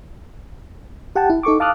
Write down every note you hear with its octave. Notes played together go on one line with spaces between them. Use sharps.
G4 F#5 G5 A5
E4
D#4 A4 C#6 D6
F5 A5 D6 D#6 F6 F#6